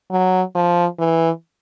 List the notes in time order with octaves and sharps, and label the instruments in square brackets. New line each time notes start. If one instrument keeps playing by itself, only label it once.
[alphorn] F#3
F3
E3